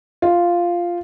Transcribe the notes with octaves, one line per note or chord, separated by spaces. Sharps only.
F4